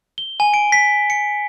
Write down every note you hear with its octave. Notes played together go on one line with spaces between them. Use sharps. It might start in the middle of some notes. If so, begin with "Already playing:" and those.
G7
G#5
D7
B6
C#7